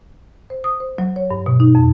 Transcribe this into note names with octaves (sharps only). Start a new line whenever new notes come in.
C5
D#6
C5
F#3
C#5
G2
B2
D#4
F2